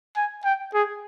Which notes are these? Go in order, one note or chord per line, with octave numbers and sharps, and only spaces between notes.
G#5
G5
G#4